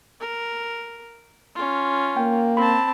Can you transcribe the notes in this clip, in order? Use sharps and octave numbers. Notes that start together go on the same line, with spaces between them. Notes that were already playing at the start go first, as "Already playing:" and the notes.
A#4
C#4 F4
A#3 G5
C4 A5 B5